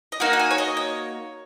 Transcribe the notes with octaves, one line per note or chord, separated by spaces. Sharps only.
D#5
A#3 D#4 F#4 F#5
F#5
G#5
C#5
D#5
C#5